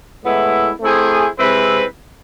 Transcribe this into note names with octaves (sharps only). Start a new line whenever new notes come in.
A2 G#3 B3 E4
A3 C4 E4 G#4 C5
C3 G#3 C4 E4 B4